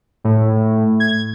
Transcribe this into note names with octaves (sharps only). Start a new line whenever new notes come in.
A2
G#6